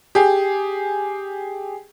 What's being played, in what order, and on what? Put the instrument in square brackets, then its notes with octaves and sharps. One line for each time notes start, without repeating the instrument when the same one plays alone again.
[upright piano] G4 G#4